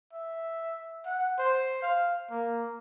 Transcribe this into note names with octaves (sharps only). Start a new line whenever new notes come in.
E5
F#5
C5
F5
A#3